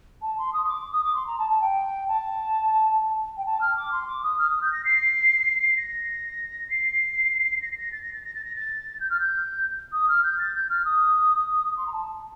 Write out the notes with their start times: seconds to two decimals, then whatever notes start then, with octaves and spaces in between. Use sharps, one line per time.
0.22 A5
0.38 C6
0.53 D#6
0.64 C6
0.68 D6
0.92 D#6
1.04 D6
1.15 C6
1.26 A#5
1.38 A5
1.50 A5
1.61 G5
2.08 A5
3.37 G5
3.45 A5
3.61 F6
3.76 D6
3.92 C6
4.07 D6
4.23 D#6
4.39 F6
4.49 D#6
4.62 G6
4.72 A#6
4.85 C7
5.77 A#6
6.70 C7
7.61 A#6
7.71 C7
7.77 A#6
7.92 A6
8.02 A#6
8.13 A6
8.24 A#6
8.34 A6
8.45 A#6
8.55 A6
9.00 G6
9.10 F6
9.19 G6
9.92 D#6
10.08 F6
10.23 G6
10.39 A6
10.54 G6
10.69 F6
10.85 D#6
11.77 C6
11.87 A#5
11.92 A5